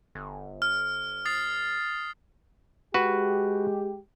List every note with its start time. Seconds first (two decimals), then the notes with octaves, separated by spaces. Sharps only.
0.15 G1
0.62 F6
1.25 D#6 A6 C7
2.94 G#3 F#4 G4 B4